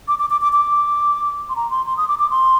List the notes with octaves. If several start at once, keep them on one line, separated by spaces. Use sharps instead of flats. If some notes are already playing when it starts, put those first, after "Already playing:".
D6
D6
D6
D6
D6
C6
A#5
C6
C6
D#6
D6
D6
C6